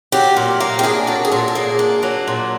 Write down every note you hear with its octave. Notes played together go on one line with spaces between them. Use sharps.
F#3 G4
A#2
A#3
G4
D4 G#4
F#3 A4
G#4
A#2 A4
A4
A#3 G#4
D4
F#3
A#2